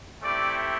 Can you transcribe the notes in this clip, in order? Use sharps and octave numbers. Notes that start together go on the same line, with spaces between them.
A3 C4 E4 G4 D5